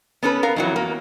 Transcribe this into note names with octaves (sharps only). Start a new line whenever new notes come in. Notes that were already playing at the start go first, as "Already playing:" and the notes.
B3 C#4 A4 B4
B3 A#4 F5
F2 E3 F#3
A#3